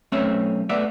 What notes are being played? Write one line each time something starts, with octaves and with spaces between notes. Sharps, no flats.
B1 A3 C4 C#4 C#5 E5
A3 B3 D5 E5